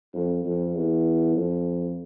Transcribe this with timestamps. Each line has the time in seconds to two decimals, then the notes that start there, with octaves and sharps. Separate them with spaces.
0.14 F2
0.44 F2
0.75 E2
1.36 F2